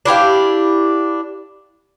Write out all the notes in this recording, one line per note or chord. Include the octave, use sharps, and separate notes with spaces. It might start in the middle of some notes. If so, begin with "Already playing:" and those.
D4 E4 G4 F5